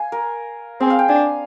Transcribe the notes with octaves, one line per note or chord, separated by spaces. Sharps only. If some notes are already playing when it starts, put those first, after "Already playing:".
Already playing: F5 G#5
A#4
C4 G#4
F5
G5
D4 G#5